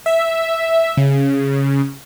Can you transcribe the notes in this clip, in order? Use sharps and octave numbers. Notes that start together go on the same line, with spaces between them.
E5
C#3